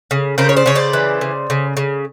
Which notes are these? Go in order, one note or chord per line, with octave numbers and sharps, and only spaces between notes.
C#3
C#3 A#4 C5
C#5
C5 D5
C#3 C#5
C5 D5
E3
C#3
C#3
C#3